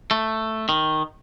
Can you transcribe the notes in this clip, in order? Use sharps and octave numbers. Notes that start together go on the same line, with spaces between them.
A3
D#3